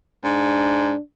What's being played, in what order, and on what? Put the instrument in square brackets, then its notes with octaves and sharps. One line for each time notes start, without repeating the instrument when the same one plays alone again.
[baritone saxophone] G#2 [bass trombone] D4